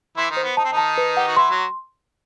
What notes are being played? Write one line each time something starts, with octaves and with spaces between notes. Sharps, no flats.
E3 E4 C6
D#3 D#4
C5
B3
D#4 A5
C4
D#3 D#4
A5
B4
G4 F#5
F#4
E3 E4 C6
F#3 F#4